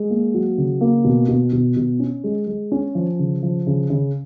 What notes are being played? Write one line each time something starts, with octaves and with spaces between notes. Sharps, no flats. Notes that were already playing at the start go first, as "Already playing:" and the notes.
Already playing: G#3
A#3
F#3
C#3
A#3
B2
B2
B2
B2
C#4
G#3
G#3
C#4
F3
C#3
F3
C#3
C#3